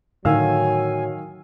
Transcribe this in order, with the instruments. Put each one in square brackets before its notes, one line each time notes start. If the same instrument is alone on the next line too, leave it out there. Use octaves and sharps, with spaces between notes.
[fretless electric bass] A2 D3 [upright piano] D#3 F5 E6 [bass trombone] F#3 [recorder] G#5